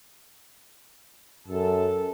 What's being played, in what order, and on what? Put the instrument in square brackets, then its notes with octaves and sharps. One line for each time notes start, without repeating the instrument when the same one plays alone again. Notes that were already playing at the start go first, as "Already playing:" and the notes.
[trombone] F#2 [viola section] A4